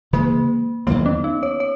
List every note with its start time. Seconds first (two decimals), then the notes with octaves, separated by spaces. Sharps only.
0.13 C#3 E3 G#3 A#3
0.87 E2 D#3 F#3 A#3 B3
1.06 C#4
1.24 D#4
1.43 C#5
1.60 C#5